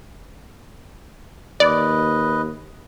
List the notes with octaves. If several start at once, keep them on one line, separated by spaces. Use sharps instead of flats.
D#2 B4 D5 D#5